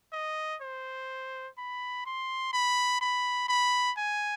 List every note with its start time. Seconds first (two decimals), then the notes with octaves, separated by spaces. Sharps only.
0.13 D#5
0.62 C5
1.58 B5
2.06 C6
2.53 B5
3.01 B5
3.48 B5
3.97 G#5